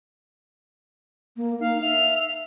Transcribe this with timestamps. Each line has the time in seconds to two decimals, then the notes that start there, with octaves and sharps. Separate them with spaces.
1.37 A#3
1.60 D#4 F5
1.82 E5 F7